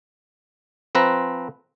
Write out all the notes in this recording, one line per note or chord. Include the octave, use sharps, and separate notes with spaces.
F3 C4 B4 A#5